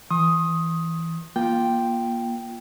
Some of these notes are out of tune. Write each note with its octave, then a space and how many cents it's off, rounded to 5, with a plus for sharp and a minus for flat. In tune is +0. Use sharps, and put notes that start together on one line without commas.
E3 +0 C6 +40 D#6 +5
A#3 +25 F4 +0 G5 +0